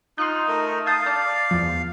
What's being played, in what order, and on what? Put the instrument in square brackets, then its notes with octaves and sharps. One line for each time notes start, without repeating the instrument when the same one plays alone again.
[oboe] D#4 [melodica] F4 [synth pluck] C6 F#6
[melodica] A3 A#4
[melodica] F5 [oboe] A5 [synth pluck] D#6 G6
[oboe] D5 [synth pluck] A5
[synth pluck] E2 F3